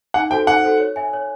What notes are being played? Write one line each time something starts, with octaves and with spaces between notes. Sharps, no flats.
D#4 F#5
F#4 A4 C5 G5
D#4 F#5
F#4 A4 C5
C#5
E5 G#5
C#5